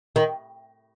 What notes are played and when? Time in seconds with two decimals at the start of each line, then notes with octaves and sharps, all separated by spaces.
0.16 D#3